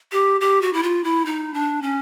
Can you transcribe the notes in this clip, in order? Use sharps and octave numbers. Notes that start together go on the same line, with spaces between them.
G4
G4
F#4
E4
F4
E4
D#4
D4
C#4